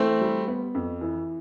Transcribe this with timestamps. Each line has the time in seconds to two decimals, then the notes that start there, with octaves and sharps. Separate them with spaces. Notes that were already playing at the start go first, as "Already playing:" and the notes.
Already playing: E3 A3 C4
0.21 G3
0.47 B3
0.74 F2
1.01 E3